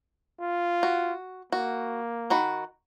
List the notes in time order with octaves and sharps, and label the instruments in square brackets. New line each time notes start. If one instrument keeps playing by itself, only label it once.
[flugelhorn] F4
[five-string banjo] F#4
[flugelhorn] A#3 [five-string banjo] F#4
[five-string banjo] D#3 F#4 B5